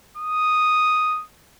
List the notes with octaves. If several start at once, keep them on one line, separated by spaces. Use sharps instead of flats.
D#6